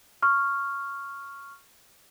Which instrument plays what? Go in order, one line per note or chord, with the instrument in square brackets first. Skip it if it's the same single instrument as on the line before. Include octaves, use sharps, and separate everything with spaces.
[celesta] C#6 F6